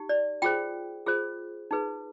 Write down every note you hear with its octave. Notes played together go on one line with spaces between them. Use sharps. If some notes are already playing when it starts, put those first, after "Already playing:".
Already playing: D#4 G4
D5
F4 G#4 C5 G5
F4 G#4 C5
D#4 G#4 B4